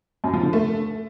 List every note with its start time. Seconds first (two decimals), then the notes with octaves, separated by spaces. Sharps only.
0.24 F#2
0.33 F3
0.43 D3
0.53 A3